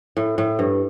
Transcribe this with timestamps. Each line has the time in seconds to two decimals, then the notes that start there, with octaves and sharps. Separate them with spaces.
0.17 A2
0.38 A2
0.59 G2